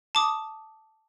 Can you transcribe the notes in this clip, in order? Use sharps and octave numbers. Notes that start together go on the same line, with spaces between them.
A5 D6 D#6